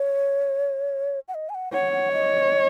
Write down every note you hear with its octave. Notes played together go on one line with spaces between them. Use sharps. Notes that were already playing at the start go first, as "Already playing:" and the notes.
Already playing: C#5
F#5
D#5
G#5
F#5
C#5 F#5
F#5
D#5